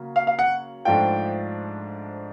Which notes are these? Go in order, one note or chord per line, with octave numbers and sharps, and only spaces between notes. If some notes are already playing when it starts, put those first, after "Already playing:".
Already playing: C#3 F#3 A#3 C#4
F5
F5
F#5
G#2 F3 A3 D4 F4 G5